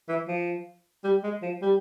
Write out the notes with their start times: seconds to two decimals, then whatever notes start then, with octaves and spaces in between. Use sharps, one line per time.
0.08 E3
0.28 F3
1.04 G3
1.23 G#3
1.42 F3
1.61 G3